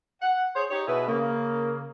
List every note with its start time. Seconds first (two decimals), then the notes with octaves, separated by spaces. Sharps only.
0.21 F#5
0.55 G#4 C5 C#5
0.71 D#4 G4 C#5
0.87 B2 E4 G#4 B4
1.08 C#3 A#3